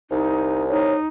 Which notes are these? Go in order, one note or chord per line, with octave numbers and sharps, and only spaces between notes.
C2 D#4
D#4 C#5